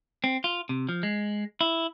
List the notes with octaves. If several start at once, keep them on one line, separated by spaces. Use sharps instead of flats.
C4
F4
C3
F3
G#3
E4